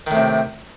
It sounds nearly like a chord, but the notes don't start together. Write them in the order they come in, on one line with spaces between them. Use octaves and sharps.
D#3 A2 C3